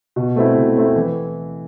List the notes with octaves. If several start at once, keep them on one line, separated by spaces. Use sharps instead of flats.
B2
A3 C4 E4
B2
A3 C4 E4
E3